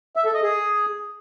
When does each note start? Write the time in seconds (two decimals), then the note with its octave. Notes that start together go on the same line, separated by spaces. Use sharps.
0.16 E5
0.25 A4
0.34 D#5
0.43 G#4